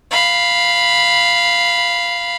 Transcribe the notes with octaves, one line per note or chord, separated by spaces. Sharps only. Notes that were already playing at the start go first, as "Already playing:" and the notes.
F5 B5